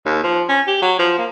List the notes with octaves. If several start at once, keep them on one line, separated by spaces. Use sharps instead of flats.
D#2
F3
C#4
G4
F#3
F3
A#3